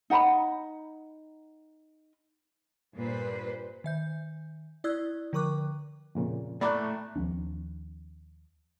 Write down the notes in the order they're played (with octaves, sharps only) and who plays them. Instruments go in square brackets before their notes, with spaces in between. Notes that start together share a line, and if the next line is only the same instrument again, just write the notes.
[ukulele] D#4 F#5 A#5 B5
[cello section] G2 A#2 B4 C5
[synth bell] D#3 E5 G6
E4 D5 D#6 E6 F#6 G#6
D3 F3 A#4 C#6 D6 F#6
[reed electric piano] F2 A#2 C#3
[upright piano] A2 [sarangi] A3 [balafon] D5 B5 D6 [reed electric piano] A#5 F#6
[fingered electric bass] D#2 F3 C4 D4